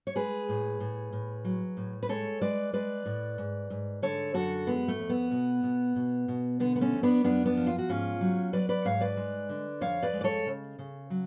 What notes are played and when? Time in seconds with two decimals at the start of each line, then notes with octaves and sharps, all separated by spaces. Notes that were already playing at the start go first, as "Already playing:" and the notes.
0.07 C#5
0.16 G#3 G#4 B4
0.49 A2
0.80 A2
1.13 A2
1.45 F#3
1.77 A2
2.03 B4
2.09 G#3 A4 C#5
2.41 G#3 B4 D5
2.73 G#3 B4 D5
3.06 A2
3.38 G#2
3.70 G#2
4.02 D3 A4 C#5
4.34 F#2 F#4 A4
4.67 G#3 B3
4.88 A3
4.99 F2
5.09 B3
5.31 B2
5.63 B2
5.96 B2
6.28 B2
6.60 D3 B3
6.76 B3
6.81 A3 C#4
6.92 F2
7.03 B3 D4
7.24 F#2 B3 D4
7.46 B3 D4
7.57 F3
7.67 F4
7.78 F#4
7.89 G#2 C#4 F4
8.21 F#3
8.53 F#3 B4 D5
8.69 B4 D5
8.85 G#2 C#5 F5
9.01 B4 D5
9.17 G#3
9.49 D3
9.81 F2 C#5 F5
10.03 B4 D5
10.13 G#3
10.21 D5
10.24 A4 C#5
10.46 C#3
10.79 C#3
11.10 F#3